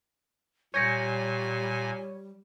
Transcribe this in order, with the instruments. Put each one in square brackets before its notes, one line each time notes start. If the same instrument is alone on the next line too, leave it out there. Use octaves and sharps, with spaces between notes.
[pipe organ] A#2 G#5 [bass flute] G3 [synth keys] C#5 [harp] G6 A#6 C#7